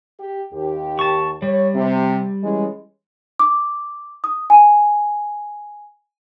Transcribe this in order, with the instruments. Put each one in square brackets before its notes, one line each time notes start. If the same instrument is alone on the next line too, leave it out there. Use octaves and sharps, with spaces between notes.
[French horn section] G4
D#2 G4
[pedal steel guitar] A5 C#6
[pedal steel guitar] G3 [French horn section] C#5
[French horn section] C3
E3 G#3 C#4
[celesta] D6
D#6
G#5